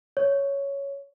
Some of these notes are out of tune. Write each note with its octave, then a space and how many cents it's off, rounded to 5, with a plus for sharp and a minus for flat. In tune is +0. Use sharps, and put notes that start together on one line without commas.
C#5 +5